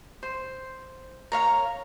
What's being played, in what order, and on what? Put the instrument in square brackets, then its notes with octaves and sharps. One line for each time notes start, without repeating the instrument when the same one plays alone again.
[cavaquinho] C5
A#4 C#5 F5 A#5